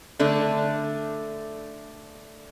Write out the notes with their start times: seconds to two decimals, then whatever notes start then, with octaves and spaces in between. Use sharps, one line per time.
0.19 D3 A3 D4